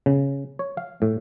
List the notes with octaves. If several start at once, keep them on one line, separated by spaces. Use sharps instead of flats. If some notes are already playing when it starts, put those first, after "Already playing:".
C#3
C#5
F5
A2